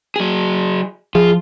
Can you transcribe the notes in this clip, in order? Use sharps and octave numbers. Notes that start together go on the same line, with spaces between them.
F#3 G#4
F3 F4 G#4